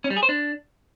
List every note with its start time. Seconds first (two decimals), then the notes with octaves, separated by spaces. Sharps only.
0.04 C#4
0.10 G3
0.17 G#4
0.23 C5
0.29 D4